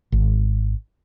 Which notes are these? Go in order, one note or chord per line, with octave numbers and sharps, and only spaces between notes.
G#1